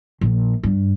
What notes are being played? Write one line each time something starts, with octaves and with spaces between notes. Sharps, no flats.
A#1
G2